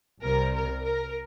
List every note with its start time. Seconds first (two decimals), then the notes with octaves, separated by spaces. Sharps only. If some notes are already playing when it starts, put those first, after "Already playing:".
0.23 C2 C3 G3 A#4
0.55 A#4
0.85 A#4